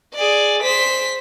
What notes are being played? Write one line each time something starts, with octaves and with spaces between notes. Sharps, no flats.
G#4 D5
C5 B6